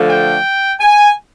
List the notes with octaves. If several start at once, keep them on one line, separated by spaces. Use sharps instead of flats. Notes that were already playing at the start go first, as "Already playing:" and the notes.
Already playing: D3 F3 A3
G5
G#5